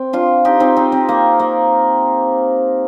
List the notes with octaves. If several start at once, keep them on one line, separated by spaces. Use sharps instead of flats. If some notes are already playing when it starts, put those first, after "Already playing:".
Already playing: C4
D4 F4
D#4 G4
C4 D#4
C4 D#4
C4
A#3
A#3